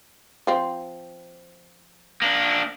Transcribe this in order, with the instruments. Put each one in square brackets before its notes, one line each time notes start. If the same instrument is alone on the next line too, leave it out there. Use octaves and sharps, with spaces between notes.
[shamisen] F3 C4
[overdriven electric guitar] A#3 D4